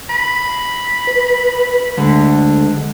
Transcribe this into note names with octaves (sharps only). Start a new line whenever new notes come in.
B5
B4
D2 D3 G#3